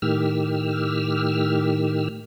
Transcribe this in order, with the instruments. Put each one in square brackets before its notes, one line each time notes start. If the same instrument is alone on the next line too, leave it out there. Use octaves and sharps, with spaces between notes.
[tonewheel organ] A2 D#3 G4 E6 F6